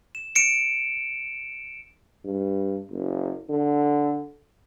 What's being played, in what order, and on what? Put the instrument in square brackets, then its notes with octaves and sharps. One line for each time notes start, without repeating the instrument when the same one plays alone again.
[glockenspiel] E7
C#7 D7 E7
[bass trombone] G2
F#1
D3